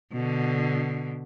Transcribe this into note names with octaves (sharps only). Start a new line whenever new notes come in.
B2 D3